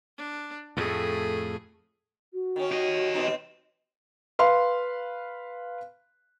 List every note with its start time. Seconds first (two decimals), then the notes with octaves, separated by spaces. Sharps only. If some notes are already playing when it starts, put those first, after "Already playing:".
0.18 D4
0.77 F2 A2 A3 G#4
2.34 F#4
2.56 D#3 C#4
2.72 G4 D#5
3.14 B2 C4 D#4
4.39 B4 F5 C6